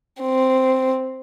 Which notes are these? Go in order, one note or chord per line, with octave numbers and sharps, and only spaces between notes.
C4